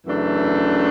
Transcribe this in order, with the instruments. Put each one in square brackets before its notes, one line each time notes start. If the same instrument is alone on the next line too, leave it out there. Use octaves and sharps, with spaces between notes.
[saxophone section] F#2 C#3 E3 A3 D4